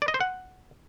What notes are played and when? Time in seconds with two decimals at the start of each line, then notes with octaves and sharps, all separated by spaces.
0.02 D5
0.08 D#5
0.14 C5
0.21 F#5